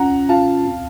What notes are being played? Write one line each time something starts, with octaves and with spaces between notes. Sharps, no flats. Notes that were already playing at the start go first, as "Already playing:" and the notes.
Already playing: C#4 F4 F#5 A#5
F4 F5 A5
C4